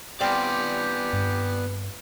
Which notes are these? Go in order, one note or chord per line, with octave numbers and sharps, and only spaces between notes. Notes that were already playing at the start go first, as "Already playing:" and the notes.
G3 B3 C4 G4 D5 F5
G2